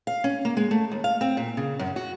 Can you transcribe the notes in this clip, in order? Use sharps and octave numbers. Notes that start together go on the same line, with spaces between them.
F5
C#4
A#3
G#3
A3
D#2
F5
C4
A#2
C#3
F#2
F#4